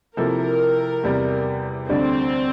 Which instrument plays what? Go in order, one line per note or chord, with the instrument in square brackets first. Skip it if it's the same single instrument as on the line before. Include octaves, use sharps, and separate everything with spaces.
[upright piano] C3 F3 A#3 E4 A4 [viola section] A#4
[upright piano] E2 C3 G3
[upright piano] D2 D3 G3 D4 [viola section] C4